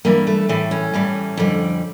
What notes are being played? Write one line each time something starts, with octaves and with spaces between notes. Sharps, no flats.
G2 E3 G3 A#3
A3
A2 E3 G3 A3
C#4
A2 E3 G3
F2 D3 G3